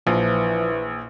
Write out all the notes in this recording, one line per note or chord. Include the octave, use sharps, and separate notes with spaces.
A#1 E3 F3